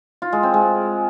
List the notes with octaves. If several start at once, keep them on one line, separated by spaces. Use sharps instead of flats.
F4
G#3
C4
G#3